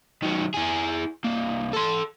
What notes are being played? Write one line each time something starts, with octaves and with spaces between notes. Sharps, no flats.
D#3 F#3
E4 G#4
C2 A#3
A4 C6